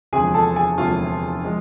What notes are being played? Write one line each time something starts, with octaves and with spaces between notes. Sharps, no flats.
E1 D2 C3 F3 G#4 G#5
A4 A5
G#4 G#5
E1 D2 C3 F3 F4 F5
F3 G#3